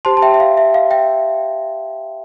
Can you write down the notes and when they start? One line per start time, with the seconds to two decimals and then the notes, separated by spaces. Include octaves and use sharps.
0.05 G4 C5 A5 C6
0.17 A5
0.22 E5 G5
0.34 E5
0.40 F5
0.57 E5
0.74 F5
0.91 E5 G5